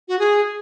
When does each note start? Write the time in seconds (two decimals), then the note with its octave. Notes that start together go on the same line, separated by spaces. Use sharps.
0.08 F#4
0.19 G#4